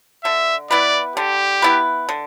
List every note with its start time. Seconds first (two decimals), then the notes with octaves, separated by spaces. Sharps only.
0.25 D3 E5
0.71 B3 E4 B4 D5
1.16 D3 G4
1.62 B3 E4 B4
2.09 D3